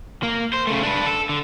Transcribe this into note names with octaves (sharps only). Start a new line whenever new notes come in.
A#3
C5
C#3 A3
D4 B4
A4
D3